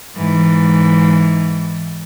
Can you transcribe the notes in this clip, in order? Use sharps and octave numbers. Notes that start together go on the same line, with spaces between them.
G#2 E3